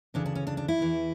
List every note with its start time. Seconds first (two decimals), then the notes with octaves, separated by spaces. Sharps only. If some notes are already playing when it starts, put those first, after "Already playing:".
0.14 D2 C#3 E3 D4
0.26 D4
0.35 C#4
0.47 D4
0.57 D4
0.68 E4
0.78 E2 E3